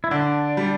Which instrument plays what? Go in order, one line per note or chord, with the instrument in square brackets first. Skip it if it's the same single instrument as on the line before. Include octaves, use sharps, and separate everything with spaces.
[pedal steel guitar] E4
[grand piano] D3 [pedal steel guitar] D4
[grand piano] G3